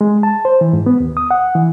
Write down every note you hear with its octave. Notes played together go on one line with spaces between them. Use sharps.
G#3
A5
C5
E3
G#2
B3
D#2
D#6
F#5
E3